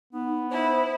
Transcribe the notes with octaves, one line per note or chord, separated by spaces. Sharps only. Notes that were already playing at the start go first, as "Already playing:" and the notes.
B3 D#4
E4 C5